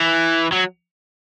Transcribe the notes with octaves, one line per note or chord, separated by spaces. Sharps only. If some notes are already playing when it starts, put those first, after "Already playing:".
Already playing: E3
F#3